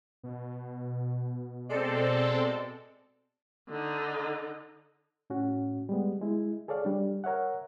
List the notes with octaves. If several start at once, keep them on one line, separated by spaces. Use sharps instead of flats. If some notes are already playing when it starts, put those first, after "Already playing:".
B2
G#3 C4 A4 D5
D3 D#4
A2 C#4 F#4
G3 G#3 B3
G#3 E4
G#4 A4 C#5 D5 F5
G3 D4
A#4 C#5 E5 F#5